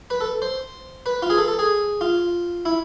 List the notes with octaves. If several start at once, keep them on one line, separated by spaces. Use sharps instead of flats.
B4
A4
C5
B4
F4
G#4
A4
A4
G#4
F4
E4